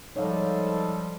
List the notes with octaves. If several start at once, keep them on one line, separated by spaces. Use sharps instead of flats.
G#2 F3 G3 D#4 A4 C#5 F5